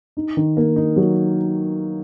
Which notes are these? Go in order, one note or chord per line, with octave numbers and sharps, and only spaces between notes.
D#4
D#3
A#3
D#4
F#3